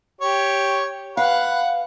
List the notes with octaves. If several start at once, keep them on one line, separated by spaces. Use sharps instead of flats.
G4 C#5
B4 F5 F#5